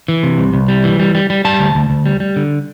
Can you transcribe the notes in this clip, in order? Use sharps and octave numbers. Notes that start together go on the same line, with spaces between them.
E3
C3
C2
C2
G3
E3
G3
G3
G3
G3 A5
D2
D2
D2
G3
G3
D3